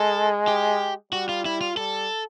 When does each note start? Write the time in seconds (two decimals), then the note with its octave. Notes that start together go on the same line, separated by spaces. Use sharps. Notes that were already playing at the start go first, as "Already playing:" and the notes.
Already playing: G#3 A4
0.47 G4
1.13 G3 F#4
1.29 F4
1.45 E4
1.61 F4
1.77 G3 A4